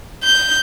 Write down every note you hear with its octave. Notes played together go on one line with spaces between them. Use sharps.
G6